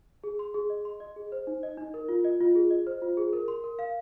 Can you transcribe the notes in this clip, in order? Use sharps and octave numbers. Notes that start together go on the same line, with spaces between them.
G#4
C6
G#4
D#5
C6
D#5
G#4
C5
D#4
D#5
D#4
A#4
F4
D#5
F4
G#4
D#5
C5
F4
G#4
A#4
C6
A#4
F5